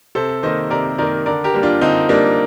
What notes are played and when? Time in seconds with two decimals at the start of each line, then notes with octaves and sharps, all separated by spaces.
0.15 C3 A4 C5
0.43 D#3 A#3 C5 D#5
0.70 C3 A#4 D5
0.98 D#3 A#3 A#4 D5
1.26 D3 A#4 D5
1.44 G4 A#4
1.54 G3 A#3
1.63 D4 F4
1.81 D3 C4 D#4
2.09 G3 A#3 D4